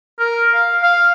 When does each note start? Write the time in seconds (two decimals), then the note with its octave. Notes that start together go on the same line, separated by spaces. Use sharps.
0.19 A#4
0.54 F5
0.83 F5